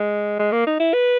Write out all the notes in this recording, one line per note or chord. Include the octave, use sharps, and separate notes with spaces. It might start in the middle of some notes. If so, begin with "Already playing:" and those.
Already playing: G#3
G#3
A#3
D#4
E4
B4